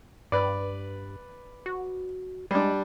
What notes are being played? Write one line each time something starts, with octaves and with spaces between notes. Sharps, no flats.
G2 B4 D5
F#4
G3 G#3 D4